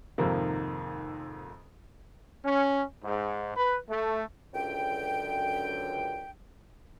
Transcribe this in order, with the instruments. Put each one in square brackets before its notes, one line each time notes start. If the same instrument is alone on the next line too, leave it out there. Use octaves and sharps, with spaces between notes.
[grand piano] F2 G#2 C3 D#3 A#3
[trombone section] C#4
G#2
B4
A3
[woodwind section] C#2 F#2 D3 G5